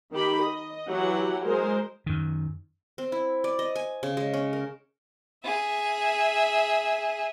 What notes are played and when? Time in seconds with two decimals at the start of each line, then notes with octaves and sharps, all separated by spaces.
0.12 D#3 G4 B5
0.42 D#5
0.88 E3 F#3 G4 F#5
1.43 G#3 A#4 C5
2.06 F#2 D#3
2.98 C4
3.12 E4
3.44 D5
3.59 D#5
3.76 G#5
4.03 C#3
4.17 G#3
4.34 C#4
4.53 A#4
5.44 G#4 E5